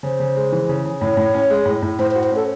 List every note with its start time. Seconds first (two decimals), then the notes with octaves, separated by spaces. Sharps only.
0.03 C#3 C5
0.20 C#3
0.36 G#3
0.52 E3
0.69 C#3
0.85 C#3
1.01 A2 C#5
1.17 A2
1.34 C#4
1.50 G#3
1.66 A2
1.83 A2
1.99 A2 C5
2.11 C5
2.16 F#4
2.23 C5
2.32 C#4 A4